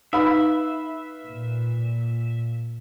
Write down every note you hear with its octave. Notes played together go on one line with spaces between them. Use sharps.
D#4 B4 E5 F5 B5
A#2